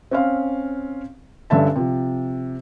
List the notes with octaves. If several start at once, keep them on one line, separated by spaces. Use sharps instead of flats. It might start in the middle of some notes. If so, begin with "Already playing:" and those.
C4 C#4 F5
G2 D3 C#4 E5 A5
C3 F3